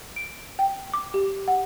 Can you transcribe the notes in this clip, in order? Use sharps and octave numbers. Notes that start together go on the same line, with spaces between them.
D7
G5
D6
G4
F#5